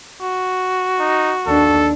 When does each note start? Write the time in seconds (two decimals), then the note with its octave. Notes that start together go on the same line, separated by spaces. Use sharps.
0.21 F#4
1.00 D#4
1.47 D#2 D4 A4